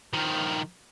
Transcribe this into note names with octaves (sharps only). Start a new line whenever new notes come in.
D#3 F3